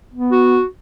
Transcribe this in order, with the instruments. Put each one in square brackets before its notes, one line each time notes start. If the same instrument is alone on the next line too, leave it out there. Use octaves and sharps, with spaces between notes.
[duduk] B3
[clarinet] F#4